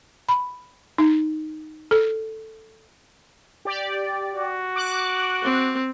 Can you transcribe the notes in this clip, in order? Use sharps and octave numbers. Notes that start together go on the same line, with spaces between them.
B5
D#4
A4
G4 D5
F#4
D6 F#6
C4